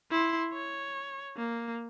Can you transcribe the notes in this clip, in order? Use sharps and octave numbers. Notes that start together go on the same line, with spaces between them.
E4 C6
C#5
A#3